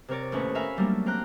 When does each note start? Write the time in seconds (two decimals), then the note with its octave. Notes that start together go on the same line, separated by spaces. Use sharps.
0.08 C3 C4 A#4 C#5 D5
0.32 D#2 A2 C#4 B4 C#6
0.55 A#4 E5 F5 G#5 B5
0.77 F#3 G3 A3 A#3 C#4 D4
1.06 C4 F5 G5 A#5 F#6